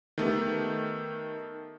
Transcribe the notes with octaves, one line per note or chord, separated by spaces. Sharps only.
D#3 A3 B3 G4